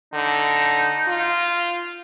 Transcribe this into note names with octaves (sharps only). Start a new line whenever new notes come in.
D3 D#4
F4